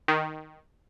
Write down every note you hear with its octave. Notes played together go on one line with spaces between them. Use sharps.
D#3